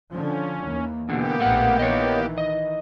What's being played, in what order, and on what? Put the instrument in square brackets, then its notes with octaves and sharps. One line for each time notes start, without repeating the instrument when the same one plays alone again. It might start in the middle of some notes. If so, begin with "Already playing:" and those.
[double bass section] D3 F3 [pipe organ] C#4
[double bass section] D#2 E3 A#3
[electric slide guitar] E2 D3 [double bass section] B2 [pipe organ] A#3 B3 G4
[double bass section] A#1 A2 [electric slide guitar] A3 F#5
[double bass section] D#3 E3 [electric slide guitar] C#5 D#5
[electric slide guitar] D#5